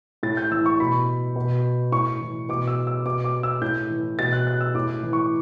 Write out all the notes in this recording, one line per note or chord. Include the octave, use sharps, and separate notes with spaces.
A2 A6
G6
E3 E6
C#6
B2 B5
B2
A2 C#6
E3
B2 D6
E6
E6
B2 D6
D6
E6
A2 G6
E3
B2 A6
F#6
F#6
E6
A2 D6
E3
C#6